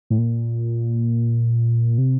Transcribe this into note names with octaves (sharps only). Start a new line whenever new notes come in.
A2
A#2
C3